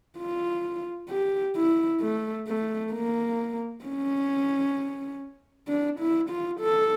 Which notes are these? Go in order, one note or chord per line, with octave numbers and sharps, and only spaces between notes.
F4
G4
E4
A3
A3
A#3
C#4
D4
E4
F4
A4